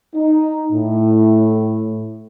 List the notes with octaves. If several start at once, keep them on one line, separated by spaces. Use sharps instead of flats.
D#4
A2